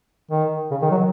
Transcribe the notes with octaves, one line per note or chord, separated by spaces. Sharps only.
D#3
C#3
D#3
F#3